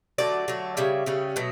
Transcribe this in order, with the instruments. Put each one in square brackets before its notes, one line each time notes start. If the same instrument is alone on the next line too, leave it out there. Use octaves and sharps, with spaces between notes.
[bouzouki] D3 F#3 A3 D5
D3 F#3 A3
C#3 G3 C#4 E5
C#3 G3 C#4
B2 F#3 A3